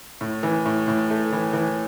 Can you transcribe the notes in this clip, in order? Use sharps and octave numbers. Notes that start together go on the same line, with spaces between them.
A2
E3
A2
A2
A3
E3
E3